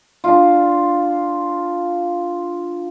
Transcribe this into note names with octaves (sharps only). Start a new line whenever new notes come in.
D4 F4